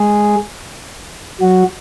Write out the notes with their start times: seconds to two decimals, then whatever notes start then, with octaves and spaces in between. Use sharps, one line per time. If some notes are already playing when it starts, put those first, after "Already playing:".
Already playing: G#3 G#4
1.41 F#3 F#4